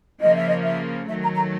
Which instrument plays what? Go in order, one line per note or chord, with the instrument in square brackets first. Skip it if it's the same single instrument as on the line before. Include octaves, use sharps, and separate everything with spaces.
[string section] C#3 F3 A#3 [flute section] D#5
[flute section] E5
D#5
E5
[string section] D#3 F#3 A3 [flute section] E5
[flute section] A#5
A#5